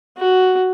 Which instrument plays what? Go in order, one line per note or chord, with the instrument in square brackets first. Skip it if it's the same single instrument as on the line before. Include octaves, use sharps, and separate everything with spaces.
[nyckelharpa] F#4